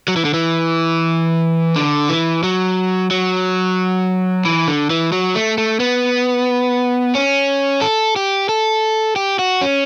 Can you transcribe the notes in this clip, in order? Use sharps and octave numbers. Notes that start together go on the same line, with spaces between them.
F#3
E3
D3
E3
D3
E3
F#3
F#3
E3
D3
E3
F#3
A3
A3
B3
C#4
A4
G4
A4
G4
F#4
C#4